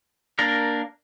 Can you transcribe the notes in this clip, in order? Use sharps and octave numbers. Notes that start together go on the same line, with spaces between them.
A#3 D4 A#4